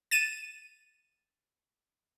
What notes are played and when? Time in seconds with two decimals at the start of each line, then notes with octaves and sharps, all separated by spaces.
0.11 A6 D#7 E7